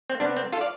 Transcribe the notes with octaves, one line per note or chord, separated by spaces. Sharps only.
C4
C3 G3 B3 D4
C4
F4 A4
D5 F5